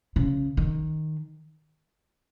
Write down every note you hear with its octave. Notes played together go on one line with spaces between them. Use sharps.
C#3
D#3